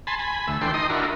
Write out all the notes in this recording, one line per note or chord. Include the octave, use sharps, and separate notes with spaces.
G#5 A5 B5 C6
G#5 B5
D2 A3 E6
E3 D4 A4 G5 C6
D#4 D#5 C6 D#6
D4 E4 F#4 A#4